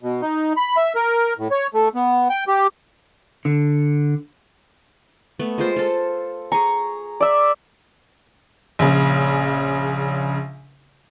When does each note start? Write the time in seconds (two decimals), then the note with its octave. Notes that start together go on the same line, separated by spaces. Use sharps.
0.03 B2
0.22 D#4
0.57 B5
0.77 E5
0.95 A#4
1.38 A2
1.51 C#5
1.74 A3
1.95 B3
2.30 G5
2.48 G4
3.45 D3
5.39 A3 B3
5.58 G#3 F4 C5
5.76 F4 A4
6.52 G#4 A#5 C#6
7.20 D5 E5
8.79 A#1 C#3